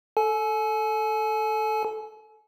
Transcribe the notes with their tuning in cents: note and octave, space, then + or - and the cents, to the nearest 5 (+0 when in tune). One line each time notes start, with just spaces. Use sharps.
A4 +0 G#5 +40